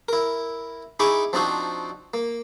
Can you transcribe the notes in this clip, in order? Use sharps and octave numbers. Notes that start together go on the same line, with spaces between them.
E4 A#4
D#4 E4 G#4 B5 C#6 D6
F3 C4 D4 D#4 F#4
A#3